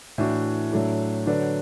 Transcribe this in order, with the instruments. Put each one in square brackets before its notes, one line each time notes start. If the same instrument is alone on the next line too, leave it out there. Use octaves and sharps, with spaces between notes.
[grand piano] A2 E3 D4 F#4
A2 F#3 A3 D4
D3 F#3 D4 B4 D5